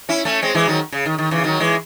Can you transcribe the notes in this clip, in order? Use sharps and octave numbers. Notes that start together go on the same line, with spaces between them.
C#4 E4
A3 C#4
G#3 C4
E3 G#3
D#3 F#3
C#3
D#3
D#3
C#3 E3
D#3 F#3
E3 G#3